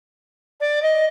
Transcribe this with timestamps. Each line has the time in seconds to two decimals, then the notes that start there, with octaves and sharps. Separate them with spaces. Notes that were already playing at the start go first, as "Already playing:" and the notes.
0.61 D5
0.82 D#5